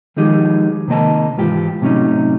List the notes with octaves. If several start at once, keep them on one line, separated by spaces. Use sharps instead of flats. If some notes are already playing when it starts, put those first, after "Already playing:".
D#3 F3 G#3 D#4 G4 G#4
C3 D#3 A#3 D#5 A5
G#2 E3 F4 G4
A2 C3 F#3 C#4 D#4